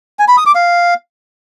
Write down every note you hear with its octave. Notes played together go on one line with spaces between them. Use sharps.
G#5
B5
D#6
D6
F5